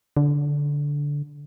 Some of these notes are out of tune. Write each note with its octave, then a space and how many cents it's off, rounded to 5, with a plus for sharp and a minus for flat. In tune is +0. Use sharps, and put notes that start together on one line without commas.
D3 -15